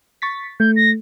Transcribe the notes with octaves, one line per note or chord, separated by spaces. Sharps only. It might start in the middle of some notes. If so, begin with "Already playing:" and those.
C#6 A6 B6
A3 G6
A#6